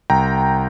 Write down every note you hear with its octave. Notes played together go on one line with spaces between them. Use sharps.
C2 G5 A#5